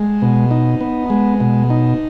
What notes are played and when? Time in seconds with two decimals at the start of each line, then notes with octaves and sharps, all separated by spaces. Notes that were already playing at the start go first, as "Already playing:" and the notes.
Already playing: G#3
0.22 B2
0.51 D#4
0.81 B3
1.10 G#3
1.40 B2
1.70 D#4